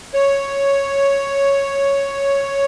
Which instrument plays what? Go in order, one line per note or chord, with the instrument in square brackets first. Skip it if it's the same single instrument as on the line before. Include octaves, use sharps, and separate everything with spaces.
[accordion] C#5